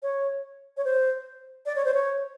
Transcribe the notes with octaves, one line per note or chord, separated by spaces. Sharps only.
C#5
C#5
C5
D5
C#5
C5
C#5